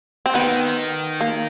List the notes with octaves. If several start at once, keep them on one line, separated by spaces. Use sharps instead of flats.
C4
D#3 B3
A#3